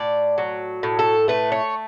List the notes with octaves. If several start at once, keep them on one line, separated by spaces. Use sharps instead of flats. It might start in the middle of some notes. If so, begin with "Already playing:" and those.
Already playing: A2 D5
F#3
A2
A4
A3 B4
C#5